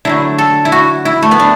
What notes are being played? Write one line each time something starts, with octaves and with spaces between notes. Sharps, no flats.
D3 F#3 A3 E4
A4
E4
F#4
E4
A3
B3
D4